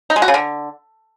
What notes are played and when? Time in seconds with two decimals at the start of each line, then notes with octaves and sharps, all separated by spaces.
0.10 D#4
0.16 G#3
0.22 F#4
0.28 C#3
0.34 D3